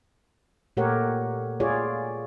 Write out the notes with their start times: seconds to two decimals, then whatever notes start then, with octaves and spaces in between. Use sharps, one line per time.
0.77 A#2 A3 G4 A#4 C#5 F#5
1.60 F4 G#4 C#5 D5